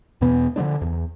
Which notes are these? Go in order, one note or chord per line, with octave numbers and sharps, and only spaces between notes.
E2 B2 B3
D3 F3 G#3 D4
E2